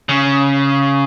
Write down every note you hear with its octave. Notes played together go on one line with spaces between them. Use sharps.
C#3